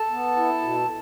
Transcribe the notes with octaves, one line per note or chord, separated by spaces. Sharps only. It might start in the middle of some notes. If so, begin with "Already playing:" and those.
Already playing: A4 A5
B3
E4
B2